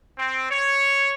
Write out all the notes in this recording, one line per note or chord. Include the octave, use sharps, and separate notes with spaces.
C4
C#5